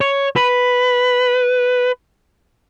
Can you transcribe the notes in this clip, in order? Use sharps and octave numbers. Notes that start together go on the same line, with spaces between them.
C#5
B4